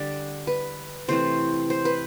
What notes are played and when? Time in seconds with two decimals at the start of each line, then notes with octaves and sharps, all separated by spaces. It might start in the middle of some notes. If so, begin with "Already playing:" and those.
Already playing: D3 G3 D4 D5
0.47 B4
1.08 C3 E3 A3 C4 C5
1.70 C5
1.85 B4